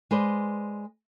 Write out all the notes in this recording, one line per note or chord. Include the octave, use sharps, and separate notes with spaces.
G#3 B4 C5 D5